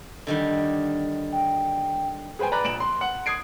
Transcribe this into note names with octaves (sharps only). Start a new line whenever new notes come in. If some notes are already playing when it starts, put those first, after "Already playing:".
D3 D#3 G3
G5
G#4 B4 C5 G5 G#5
B4 D5 A#5 B5 F#6
A#1 D7 E7 F#7
C6
F#5
D#6 G#6 C7 D7